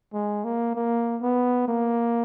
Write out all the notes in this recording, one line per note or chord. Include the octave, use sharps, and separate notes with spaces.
G#3
A#3
A#3
B3
A#3